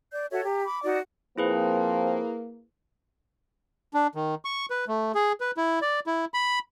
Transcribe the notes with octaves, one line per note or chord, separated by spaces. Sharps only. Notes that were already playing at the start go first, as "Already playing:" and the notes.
D5 G6
F#4 A4 C#5 E5
G4 A#5
B5 D6
D#4 F#4 D5
F3 A#3 C4 E4 G#4 B4
D4
D#3
C#6
B4
A3
G#4
B4
E4
D5
E4
B5